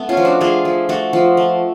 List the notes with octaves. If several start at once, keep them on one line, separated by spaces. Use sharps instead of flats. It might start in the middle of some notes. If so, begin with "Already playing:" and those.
Already playing: A3 B3
C#4 F4
F3
D4 F#4
A3 F4 G#4
F3
A3 F#4 A4
F3
A3